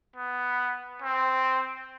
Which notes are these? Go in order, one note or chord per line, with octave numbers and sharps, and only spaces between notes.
B3
C4